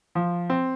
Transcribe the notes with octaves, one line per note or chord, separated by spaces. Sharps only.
F3
C4